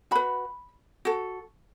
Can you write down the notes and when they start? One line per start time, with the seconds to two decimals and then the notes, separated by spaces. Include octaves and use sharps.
0.11 F#4 B4 B5
1.05 F#4 A4